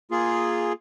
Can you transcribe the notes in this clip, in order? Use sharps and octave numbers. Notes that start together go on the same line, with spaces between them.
A#3 F4 G#4